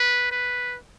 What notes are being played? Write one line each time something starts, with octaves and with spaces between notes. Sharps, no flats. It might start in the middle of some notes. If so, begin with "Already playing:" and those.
Already playing: B4
B4